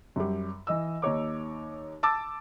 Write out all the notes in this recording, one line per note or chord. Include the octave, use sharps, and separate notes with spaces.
F#2 G3
E3 D#5 E6
D#2 D#4 C#5 D6
A5 D6 E6 A6